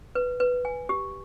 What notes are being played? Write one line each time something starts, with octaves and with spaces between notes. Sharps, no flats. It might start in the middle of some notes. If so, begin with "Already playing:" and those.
B4
B4
G#5
G4